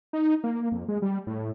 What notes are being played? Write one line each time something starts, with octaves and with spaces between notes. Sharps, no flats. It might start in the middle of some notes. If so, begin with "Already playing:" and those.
D#4
A#3
F2
G#3
G3
A2